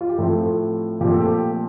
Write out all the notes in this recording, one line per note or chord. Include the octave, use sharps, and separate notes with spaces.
F4
G4
A2 F3 A3 C4 A4
A#2 F3 A3 C4 G4
A4
G4